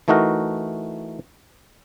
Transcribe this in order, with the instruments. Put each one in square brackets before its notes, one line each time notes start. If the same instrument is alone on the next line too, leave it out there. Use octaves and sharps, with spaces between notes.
[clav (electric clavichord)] E3 A3 D#4 F#4 A#4